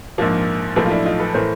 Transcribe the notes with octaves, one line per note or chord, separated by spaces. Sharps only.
A#1 G#2 F3 A#3
B1 A2 F3 A3 A#3
F4
D4 E4
D#4 F4
A4 B4
A2 E3 A3 A#4 C5